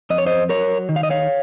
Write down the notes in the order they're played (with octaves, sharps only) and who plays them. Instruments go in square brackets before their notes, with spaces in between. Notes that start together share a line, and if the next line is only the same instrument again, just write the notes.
[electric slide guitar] F2 D#5
C#5
C5 D#5
F#3 A#4 C#5
D#3
F5
D#5
C#5 F5